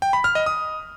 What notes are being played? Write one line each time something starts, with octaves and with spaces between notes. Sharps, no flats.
G5
B5
F6
D#5
D#6